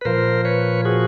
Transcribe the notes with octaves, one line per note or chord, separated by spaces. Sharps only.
B4
A#2 F3 A#4 C5
B4 C#5
F#4 G#4